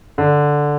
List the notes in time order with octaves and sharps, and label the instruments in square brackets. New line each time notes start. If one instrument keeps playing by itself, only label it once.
[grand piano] D3